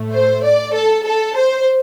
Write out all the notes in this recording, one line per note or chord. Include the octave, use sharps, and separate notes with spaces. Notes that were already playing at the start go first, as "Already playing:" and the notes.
Already playing: A2 A3
C5
D5
A4
A4
C5